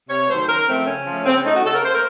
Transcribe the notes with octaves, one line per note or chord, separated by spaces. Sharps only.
C3 C#5
D#3 F#3 A3 C5
C#3 A#4
F3 A3 C4
C#3 C#4
F3 A3
C#3 C4
C#4
A3 D#4
F#4
C#3 A4
A#4
A3 C5
A#4